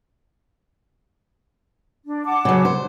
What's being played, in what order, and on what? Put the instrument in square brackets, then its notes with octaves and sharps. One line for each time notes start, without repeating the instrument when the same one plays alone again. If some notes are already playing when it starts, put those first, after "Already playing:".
[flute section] D4
F#5 A5 D6
[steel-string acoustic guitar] C#3 F#3
C5